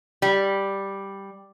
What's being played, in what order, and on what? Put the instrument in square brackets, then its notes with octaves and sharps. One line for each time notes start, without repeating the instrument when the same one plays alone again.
[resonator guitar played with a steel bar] G3